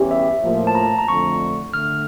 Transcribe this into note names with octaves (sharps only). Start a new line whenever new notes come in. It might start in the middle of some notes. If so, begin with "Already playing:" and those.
Already playing: E2 E3 G3 C#4 G4
E5
A2 F3 A#3
A5
A#5
A#5
F2 D3 A3 C#6
D3 A3 F6